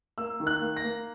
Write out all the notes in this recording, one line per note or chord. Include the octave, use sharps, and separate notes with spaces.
A#3 E6
D#3
F#6
A#3
A#6
A#3